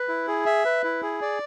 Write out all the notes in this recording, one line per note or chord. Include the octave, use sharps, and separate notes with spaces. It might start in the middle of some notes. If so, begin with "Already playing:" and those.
Already playing: B4
E4
G#4
E5
B4
E4
G#4
D5